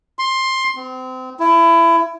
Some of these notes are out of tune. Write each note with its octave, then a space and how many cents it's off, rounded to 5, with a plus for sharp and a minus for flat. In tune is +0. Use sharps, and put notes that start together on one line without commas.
C6 +15
C4 -30
E4 +25